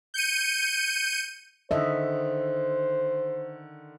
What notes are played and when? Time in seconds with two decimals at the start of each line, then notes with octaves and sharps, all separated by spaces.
0.14 G6 C#7 D#7
1.71 D3 D#3 C5 D#5 E5